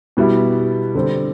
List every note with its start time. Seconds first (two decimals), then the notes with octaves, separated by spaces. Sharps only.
0.17 B2 G3 B3 E4
0.95 D3 G3 C4